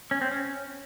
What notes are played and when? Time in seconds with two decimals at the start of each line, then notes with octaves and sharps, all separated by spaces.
0.11 C#4
0.21 C4
0.31 C#4